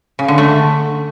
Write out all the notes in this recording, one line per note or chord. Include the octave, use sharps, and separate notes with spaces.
C#3
D3
A3